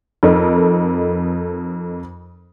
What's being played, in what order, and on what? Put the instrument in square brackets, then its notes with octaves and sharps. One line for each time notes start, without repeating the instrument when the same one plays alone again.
[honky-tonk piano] F2 D#4 A4 A#4